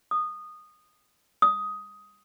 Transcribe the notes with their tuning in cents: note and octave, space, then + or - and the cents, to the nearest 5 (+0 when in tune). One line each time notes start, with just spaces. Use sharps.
D#6 -15
D#6 +10